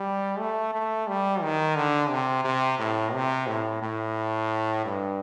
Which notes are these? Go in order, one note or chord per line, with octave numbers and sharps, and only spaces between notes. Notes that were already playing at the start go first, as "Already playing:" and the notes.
Already playing: G3
A3
A3
G3
D#3
D3
C3
C3
A2
C3
A2
A2
G2